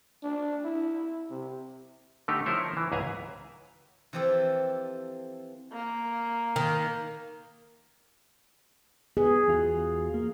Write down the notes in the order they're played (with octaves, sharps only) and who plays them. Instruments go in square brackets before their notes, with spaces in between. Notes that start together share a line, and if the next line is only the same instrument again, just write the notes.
[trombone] D4
E4
C3
[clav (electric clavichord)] D3 A3 D#4 G4
F3 A3 E4 A#4 C5 C#5
E3
C#2 G#2 G#4 E5 G#5 A#5
[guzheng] E3 F3 C4 G4 A4
[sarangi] A#3
[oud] D#3
[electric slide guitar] B3 [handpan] G#4
[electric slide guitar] E2 F4 F#4
A#3